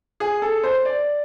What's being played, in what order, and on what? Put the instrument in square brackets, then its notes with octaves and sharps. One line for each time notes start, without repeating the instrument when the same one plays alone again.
[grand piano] G#4
A4
C5
D5